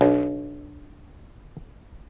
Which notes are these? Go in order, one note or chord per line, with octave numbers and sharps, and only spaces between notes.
B1 D4